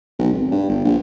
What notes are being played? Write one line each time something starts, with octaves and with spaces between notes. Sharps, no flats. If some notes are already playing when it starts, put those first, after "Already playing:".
B1
G#1
G2
G1
A#1